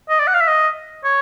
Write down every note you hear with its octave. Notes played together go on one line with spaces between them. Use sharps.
D#5
D5
F#5
F5
E5
D#5
C#5